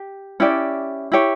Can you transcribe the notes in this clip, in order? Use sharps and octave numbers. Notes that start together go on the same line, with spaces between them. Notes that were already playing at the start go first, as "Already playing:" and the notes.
Already playing: G4
C#4 E4 G4 D5
E4 G4 C#5